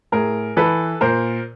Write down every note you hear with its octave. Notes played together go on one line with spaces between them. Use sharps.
A2 G#4 A#4
E3 A4 B4
A#2 A#4 C5